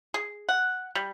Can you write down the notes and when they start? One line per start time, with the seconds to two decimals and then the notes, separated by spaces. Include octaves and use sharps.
0.14 G#4
0.49 F#5
0.95 G3